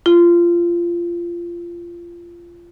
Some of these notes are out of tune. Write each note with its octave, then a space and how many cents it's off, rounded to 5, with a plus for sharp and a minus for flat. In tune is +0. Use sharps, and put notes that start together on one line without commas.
F4 -20